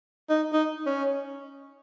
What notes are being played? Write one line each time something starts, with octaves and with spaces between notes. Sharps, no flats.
D#4
D#4
C#4